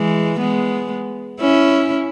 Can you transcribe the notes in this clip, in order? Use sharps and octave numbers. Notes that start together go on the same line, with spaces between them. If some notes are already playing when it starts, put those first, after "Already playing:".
Already playing: E3 G#3
G#3 B3
C#4 E4